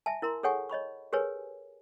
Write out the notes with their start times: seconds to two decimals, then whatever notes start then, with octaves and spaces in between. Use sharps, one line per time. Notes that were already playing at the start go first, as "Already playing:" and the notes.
0.06 E5 G#5 A5
0.22 E4 A#4 A#5 C6
0.43 G#4 A4 C#5 F#5 G#5 C#6
0.70 C#5 D#5 B5 C#6
1.13 G4 G#4 A#4 B4 C#5 G#5